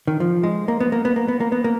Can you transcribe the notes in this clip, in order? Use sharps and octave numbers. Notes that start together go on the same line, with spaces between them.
D#3
F3
G#3
A#3
B3
A#3
B3
A#3
B3
A#3
B3
A#3